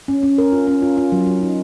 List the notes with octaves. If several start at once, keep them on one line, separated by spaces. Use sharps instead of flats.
C#4
C#4
A#4
F4
C#4
F4
F4
F#3
F#3
D#4